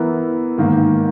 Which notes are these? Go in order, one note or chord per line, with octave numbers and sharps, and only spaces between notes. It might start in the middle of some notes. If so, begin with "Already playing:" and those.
Already playing: E3 B3 E4 A#4
G#2 D#3 A#3